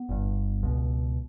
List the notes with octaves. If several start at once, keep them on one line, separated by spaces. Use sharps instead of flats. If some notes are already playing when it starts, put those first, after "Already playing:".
Already playing: B3
G1 G2
C#2 B2